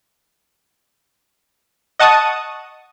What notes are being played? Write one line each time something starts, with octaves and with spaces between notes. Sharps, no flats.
D#5 F#5 A5 C#6 D#6